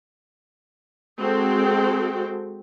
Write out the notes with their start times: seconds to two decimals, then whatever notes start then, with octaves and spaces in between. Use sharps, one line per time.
1.20 G#3 C4 F#4 A4 G5